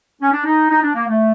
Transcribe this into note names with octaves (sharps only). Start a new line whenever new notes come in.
C#4
D4
D#4
D#4
D4
A#3
A3